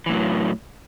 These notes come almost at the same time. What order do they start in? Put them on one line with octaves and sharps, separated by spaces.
E3 A2 F#3